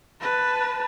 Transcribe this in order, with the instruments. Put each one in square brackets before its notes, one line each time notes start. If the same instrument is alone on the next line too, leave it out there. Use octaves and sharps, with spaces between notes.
[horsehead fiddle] B4 A5